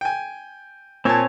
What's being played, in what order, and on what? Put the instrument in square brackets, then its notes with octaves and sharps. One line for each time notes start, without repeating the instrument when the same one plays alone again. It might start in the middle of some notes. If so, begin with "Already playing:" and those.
[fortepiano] G5 G#5
[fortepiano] A#2 A5 [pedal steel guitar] C4 C#5 G#5